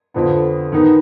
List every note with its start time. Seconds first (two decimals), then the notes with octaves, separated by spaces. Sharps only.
0.14 F2 D3 F3 B3
0.72 D#3 B3 D#4